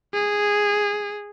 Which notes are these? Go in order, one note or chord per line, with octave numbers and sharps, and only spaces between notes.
G#4